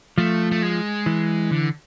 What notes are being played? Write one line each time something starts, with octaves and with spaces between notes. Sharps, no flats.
F3 A3
A3
G#3
E3
D3